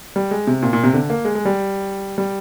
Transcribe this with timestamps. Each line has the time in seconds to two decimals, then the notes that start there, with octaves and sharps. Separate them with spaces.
0.16 G3
0.31 G#3
0.47 C3
0.62 A#2
0.73 A#2
0.84 C3
0.94 D3
1.10 A#3
1.25 G#3
1.35 G#3
1.45 G3
2.18 G3